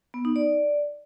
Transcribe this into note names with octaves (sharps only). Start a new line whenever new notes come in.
B3
D#4
D5